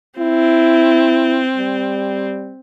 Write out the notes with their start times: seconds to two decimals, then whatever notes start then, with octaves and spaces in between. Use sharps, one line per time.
0.19 C4 E4
1.57 G3